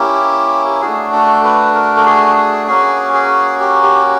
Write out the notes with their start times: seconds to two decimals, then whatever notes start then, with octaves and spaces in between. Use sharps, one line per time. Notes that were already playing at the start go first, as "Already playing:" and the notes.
Already playing: A#3 C#4 E4 G4
0.81 A3 D4 F#4 G#4
1.13 A4
1.44 B4
1.75 A#4
1.96 A4
2.05 G#4
2.37 G#4
2.67 A#3 C#4 F#4 G#4
3.14 G#4
3.60 G4
3.83 G4